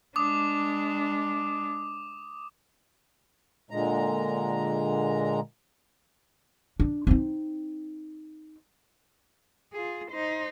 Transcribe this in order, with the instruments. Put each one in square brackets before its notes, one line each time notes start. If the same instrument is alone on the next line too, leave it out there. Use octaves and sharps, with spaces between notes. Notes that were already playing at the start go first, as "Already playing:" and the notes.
[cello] G#3 D4 [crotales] D6 D#6
[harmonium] A#2 D3 G#3 A#5
[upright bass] D4
C4 D#4
[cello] F4 G#4
D#4 C5